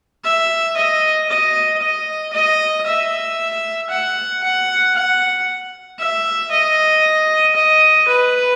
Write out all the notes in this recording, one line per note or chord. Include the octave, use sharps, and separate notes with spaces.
E5
D#5
D#5
D#5
D#5
E5
F#5
F#5
F#5
E5
D#5
D#5
B4